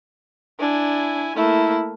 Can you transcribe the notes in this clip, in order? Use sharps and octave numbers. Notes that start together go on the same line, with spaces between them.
D4 E4 G#5
A3 A#3 E4